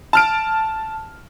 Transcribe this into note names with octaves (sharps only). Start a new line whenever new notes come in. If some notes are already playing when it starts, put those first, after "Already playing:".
A5 F6 D7